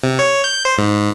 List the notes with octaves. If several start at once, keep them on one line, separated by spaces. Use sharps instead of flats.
C3
C#5
G6
C5
G#2